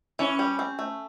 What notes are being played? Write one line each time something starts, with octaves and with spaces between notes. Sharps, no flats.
E3 C#4
G3
C4
A3